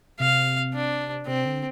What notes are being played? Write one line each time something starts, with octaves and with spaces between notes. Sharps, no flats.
C3 F5
D4
C3 C4
D3